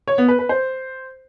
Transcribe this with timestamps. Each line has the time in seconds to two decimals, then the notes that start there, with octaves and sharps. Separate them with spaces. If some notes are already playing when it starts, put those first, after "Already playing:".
0.08 C#5
0.18 B3
0.28 B4
0.39 B4
0.49 C5